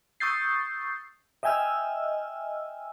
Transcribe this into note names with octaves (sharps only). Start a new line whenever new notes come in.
C#6 D#6 E6 G6 A6 C7
D#5 E5 G5 G#5 E6 F6